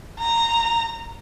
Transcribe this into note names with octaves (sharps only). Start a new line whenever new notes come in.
A#5